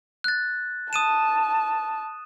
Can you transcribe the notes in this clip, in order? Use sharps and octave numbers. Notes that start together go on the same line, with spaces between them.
F#6 A6
A5 D#6 D#7 E7